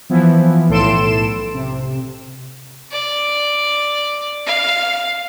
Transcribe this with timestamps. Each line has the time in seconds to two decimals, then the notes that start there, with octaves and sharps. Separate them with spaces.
0.10 E3 F3 B3 E4
0.69 B1 A2 A4 C6 D7 E7
1.54 C3
2.92 D5
4.46 F5